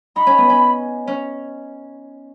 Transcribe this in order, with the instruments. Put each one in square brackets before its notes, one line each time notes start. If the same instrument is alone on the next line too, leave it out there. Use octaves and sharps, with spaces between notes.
[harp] D#4 [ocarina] B5
[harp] C#4
B3
C#4
C#4